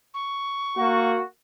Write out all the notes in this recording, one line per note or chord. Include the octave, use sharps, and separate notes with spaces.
C#6
A#3 F#4